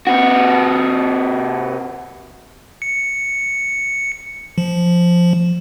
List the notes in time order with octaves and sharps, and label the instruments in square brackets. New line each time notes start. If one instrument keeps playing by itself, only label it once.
[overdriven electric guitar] C3 F#4
[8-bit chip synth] C#7
F3